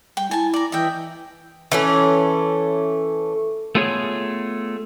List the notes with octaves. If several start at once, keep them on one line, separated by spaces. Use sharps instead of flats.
G3 G5
E4 G#5 A5
D5 A#5
E3 D#5 E5 G5
E3 A3 C#4
A3 B3 F4 G#4 C#5